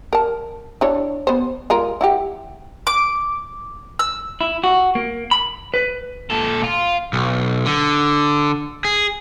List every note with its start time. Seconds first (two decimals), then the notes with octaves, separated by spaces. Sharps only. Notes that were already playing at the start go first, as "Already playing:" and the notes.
0.13 A#4 A5
0.81 D4 E4 C#5
1.27 B3 C5
1.70 G#3 F4 A#4
2.01 E4 F#4 G4
2.87 D6
3.99 E6
4.41 E4
4.64 F#4
4.95 A#3
5.31 B5
5.74 B4
6.30 A#2 A4
6.64 F4
7.13 B1
7.66 D3
8.85 G#4